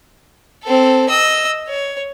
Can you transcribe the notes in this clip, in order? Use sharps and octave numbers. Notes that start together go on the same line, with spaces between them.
C4 A4
D#5 E6
C#5